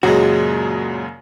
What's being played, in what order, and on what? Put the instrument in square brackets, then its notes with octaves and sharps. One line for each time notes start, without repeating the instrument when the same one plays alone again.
[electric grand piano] F#2 C#3 F#3 [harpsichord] A#2 G#3 [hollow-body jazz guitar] F#4